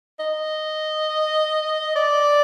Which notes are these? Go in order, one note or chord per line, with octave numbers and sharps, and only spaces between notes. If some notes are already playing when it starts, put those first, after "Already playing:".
D#5
D5